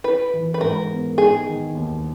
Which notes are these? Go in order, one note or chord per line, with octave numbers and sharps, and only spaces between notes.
E4 B4
E3
B4
G#2 A#4
B3
D#4 G#4
D#3
D#2